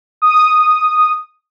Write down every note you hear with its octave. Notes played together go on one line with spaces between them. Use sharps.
D#6